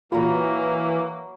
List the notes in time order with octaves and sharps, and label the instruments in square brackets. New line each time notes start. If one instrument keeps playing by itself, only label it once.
[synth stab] A#2 F4 [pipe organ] E3 [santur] F#3 A#5 B5 [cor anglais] A#3